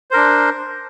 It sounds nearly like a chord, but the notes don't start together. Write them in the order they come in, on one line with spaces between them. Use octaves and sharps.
C5 A#4 D4